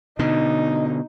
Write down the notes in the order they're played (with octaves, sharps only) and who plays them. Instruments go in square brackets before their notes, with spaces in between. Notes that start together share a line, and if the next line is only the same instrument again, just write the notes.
[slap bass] B2 D3 [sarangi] D#4